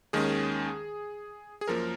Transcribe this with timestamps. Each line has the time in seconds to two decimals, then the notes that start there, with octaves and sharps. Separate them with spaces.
0.13 D#2 D#3 G#3 C#4 G#4
1.61 G#4
1.68 F#2 F3 A#3 A#4